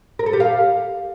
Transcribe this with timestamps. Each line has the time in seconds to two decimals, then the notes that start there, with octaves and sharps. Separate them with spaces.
0.19 A#4
0.26 A4
0.33 G4
0.40 F5